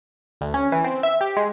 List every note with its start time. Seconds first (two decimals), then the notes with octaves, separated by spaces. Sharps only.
0.41 D2
0.54 C#4
0.72 E3
0.84 C4
1.03 E5
1.21 G4
1.37 G#3